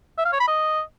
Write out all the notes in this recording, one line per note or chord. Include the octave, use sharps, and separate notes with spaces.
E5
F5
C#5
B5
D#5